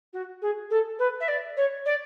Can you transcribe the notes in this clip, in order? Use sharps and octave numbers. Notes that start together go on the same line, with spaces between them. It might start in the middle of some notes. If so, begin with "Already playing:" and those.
F#4
G#4
A4
B4
E5
D5
C#5
D5